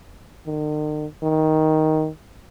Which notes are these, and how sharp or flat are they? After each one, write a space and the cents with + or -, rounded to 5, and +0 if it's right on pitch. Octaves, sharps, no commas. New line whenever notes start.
D#3 -45
D#3 +10